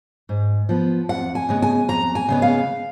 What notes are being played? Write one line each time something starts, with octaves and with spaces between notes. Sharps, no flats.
G#2
F3 B3
F2 F#5
G#5
C#3 G#3 B3
G#5
F2 A#5
G#5
C#3 G#3 B3
F5